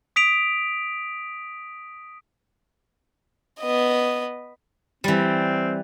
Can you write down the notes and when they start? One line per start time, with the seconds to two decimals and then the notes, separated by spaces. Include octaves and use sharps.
0.16 D#6 B6 D7 F7
3.60 B3 D#5
5.04 E3 G3 C4